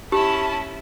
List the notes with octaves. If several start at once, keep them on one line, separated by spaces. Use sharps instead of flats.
C#4 E4 G4 A5 B5